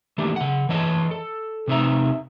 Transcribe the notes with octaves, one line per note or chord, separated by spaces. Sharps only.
D#3 E3 A3 A#3 D4 G4
C#3 F#5
E3 C#5 D#5 A5
A4
C3 C4 D#4 G#4 E5 A#5